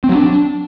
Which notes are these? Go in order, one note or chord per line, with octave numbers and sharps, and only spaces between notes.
C4
F#3
D4